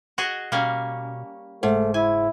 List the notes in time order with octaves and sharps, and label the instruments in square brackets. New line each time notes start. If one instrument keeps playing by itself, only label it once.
[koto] F#4 G#4 D#5
[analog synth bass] B2 [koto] G3 A#3 C#4
[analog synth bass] F#1 [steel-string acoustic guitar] G#2 [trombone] A3
[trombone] E4 [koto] G#5